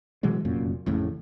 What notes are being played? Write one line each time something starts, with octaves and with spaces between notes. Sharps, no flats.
B2 E3 F#3 G#3
F1 F#2 A#2
A1 F2 A2 C#3